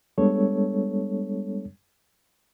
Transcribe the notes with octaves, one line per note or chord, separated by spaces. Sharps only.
G3 G#3 B3 D4 A4 C#5